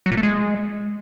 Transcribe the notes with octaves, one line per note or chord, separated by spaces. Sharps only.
F#3
A#2
A3
G#3